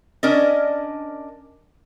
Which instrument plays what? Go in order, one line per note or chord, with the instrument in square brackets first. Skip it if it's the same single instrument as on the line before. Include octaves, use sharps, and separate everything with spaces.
[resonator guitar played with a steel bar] C#4 D4 A#4 D5 D#5